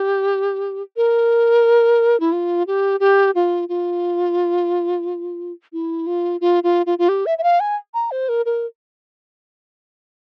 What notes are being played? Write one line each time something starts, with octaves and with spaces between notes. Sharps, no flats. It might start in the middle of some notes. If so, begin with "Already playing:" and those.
Already playing: G4
A#4
E4
F4
G4
G4
F4
F4
E4
F4
F4
F4
F4
F4
G4
E5
E5
F5
G#5
A#5
C5
A#4
A#4